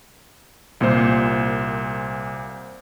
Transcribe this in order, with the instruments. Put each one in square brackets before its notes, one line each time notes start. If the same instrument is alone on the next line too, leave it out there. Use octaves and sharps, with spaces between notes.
[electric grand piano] C2 A#2 A#3 C5